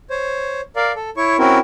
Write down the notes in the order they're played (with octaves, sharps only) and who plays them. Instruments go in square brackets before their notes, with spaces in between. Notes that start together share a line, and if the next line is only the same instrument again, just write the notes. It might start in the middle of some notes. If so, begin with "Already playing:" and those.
[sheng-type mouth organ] C5 C#5
A#4 D5 F5
A4
E4 C#5 C#6
C4 C#4 E4 F#4 A#4